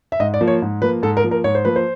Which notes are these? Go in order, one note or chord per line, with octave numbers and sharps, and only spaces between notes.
E5
G#2 D#5
D5
F3 A#3
C#5
G#2
F3 A#3 B4
G#2 A4
A#4
F3 A#3
A#4
G#2 C#5
C5
F3 A#3 B4
C5